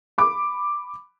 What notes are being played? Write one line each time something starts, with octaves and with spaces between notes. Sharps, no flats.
B5 D6